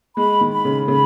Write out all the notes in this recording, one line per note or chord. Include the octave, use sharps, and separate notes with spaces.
G#3 B5
D#3
B5
C#3
C#3 B5